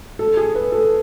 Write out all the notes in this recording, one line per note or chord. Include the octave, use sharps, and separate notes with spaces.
A4
G#4
B4
A4